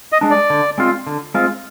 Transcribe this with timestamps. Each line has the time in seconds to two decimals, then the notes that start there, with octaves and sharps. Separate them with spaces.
0.12 D#5
0.21 G#3 D4
0.31 D5
0.50 D3
0.78 G#3 C4 F4
1.07 D3
1.34 G#3 C4 F4